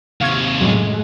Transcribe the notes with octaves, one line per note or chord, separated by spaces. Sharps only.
D#2 C3 F5 C#6 G#6
F#2 A2 G#3